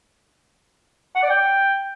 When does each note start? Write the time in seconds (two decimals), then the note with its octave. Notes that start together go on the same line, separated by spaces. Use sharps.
1.15 F#5
1.22 D5
1.30 G5